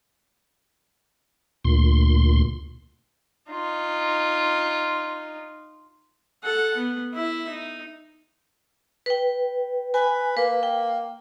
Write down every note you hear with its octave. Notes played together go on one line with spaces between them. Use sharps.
D2 A#2 C6
D#4 F4
A4 F#5
B3
E4 E5
D#4
B4 G5
B4 G#5
A#3 B4
G5